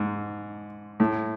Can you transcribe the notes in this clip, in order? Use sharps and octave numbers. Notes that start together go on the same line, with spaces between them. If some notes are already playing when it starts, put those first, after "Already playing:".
Already playing: G#2
A2